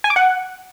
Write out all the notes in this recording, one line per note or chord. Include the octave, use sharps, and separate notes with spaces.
G#5
D6
F#5